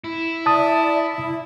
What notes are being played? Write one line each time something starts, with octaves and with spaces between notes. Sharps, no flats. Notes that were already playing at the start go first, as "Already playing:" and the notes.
E4
D5 E5 A5 D#6
E4